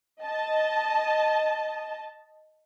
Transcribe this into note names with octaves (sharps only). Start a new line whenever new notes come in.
D#5 A5